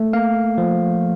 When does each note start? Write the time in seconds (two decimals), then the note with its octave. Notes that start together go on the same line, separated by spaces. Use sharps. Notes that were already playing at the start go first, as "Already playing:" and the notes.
Already playing: A3
0.13 A#3 F5
0.58 F3